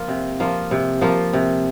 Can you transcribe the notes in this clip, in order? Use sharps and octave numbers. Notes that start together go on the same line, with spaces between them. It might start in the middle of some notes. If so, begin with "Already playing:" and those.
Already playing: F3 A#3 F4
C3
F3 A#3 F4
C3
F3 A#3 F4
C3